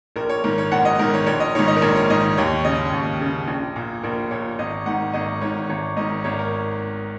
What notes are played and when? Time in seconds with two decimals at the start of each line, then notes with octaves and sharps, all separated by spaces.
0.16 A#1 A#4
0.29 C#5
0.44 G#2 D#3 A#4
0.58 C#5
0.72 A#1 F#5
0.85 D#5
0.99 G#2 D#3 A#4
1.14 C#5
1.27 A#1 C#5
1.40 D#5
1.55 G#2 D#3 C#5
1.68 D#5
1.76 A#4
1.82 A#1 C#5
1.96 C#5
2.10 G#2 D#3 D#5
2.37 D#2 C#5
2.65 C#3 D#5
2.93 D#2
3.21 C#3
3.48 A#1
3.76 A#2
4.03 A#1 A#4
4.31 A#2 C#5
4.59 G#1 D#5
4.86 G#2 D#3 F#5
5.13 G#1 D#5
5.41 G#2 D#3 C#5
5.70 G#1 C#5
5.97 G#2 D#3 D#5
6.24 G#1 C#5
6.39 A#4